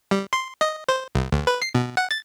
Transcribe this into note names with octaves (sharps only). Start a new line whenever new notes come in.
G3
C6
D#5
C5
C2
D2
B4
C7
B2
F#5
A6